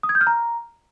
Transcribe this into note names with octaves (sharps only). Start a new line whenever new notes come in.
D#6
G#6
G6
F6
A#5